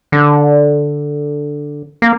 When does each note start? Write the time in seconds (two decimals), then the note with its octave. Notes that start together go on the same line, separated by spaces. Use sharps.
0.12 D3
2.02 A#3